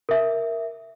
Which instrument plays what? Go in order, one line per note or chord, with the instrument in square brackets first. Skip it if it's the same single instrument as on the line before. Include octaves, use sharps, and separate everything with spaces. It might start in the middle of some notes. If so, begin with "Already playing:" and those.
[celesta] A#4 E5